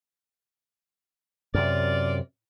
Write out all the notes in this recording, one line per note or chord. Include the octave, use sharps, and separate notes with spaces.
F#2 C3 F4 A#4 D5